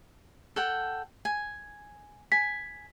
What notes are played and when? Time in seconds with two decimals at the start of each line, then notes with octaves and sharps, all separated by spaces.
0.56 A4 F#5 G5
1.25 G#5
2.32 G#5 B6